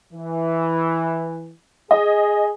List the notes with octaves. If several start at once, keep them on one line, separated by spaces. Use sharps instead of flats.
E3
G#4 D#5